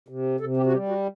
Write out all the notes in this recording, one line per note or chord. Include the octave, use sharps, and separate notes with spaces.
C3
C3 A4
G4
F#4
G3 G4
F#4